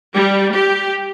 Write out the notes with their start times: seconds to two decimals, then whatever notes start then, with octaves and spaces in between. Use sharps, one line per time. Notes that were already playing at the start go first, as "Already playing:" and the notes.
0.14 G3
0.54 G4